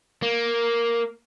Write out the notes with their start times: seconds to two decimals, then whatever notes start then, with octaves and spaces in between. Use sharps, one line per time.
0.22 A#3